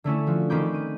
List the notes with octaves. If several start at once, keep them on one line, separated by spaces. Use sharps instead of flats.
D3 A3 C#4 E4
F3 F#4
D#3 C4 C#4 B5 D6 G6
D#7